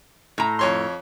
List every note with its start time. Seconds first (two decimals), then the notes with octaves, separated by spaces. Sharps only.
0.38 A2 A#5
0.59 F2 C#5 C6